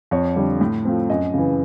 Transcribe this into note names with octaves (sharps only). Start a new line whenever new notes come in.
F2 C#5
D3 G3
A2
F3 A3 C4
F#2 D#5
C#3 E3